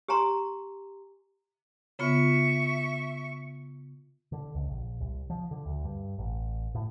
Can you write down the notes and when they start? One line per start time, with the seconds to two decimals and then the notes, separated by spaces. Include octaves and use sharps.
0.09 G4 G#5 A#5 C6
1.99 C#3 B3 F4 E5 C#6
4.32 D3
4.55 C#2
4.70 A#1
5.01 C2
5.30 F3
5.51 D3
5.66 D2
5.85 G2
6.18 A1
6.75 A2